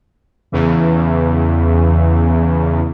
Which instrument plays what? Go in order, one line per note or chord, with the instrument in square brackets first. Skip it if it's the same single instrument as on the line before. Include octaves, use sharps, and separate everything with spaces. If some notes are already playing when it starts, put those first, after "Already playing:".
[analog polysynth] E2 C#3 E3